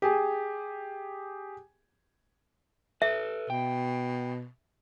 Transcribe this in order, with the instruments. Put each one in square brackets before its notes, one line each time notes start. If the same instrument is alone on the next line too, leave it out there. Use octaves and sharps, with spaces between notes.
[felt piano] G4 G#4 G#5
[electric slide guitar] A4 B4 [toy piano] E5
[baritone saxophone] B2 [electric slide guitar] G5